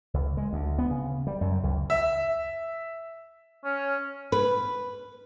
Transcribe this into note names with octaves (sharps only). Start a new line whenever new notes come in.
C#2
G#3
D2
B3
C#3
G3
F#2
C#2
E5
C#4
B4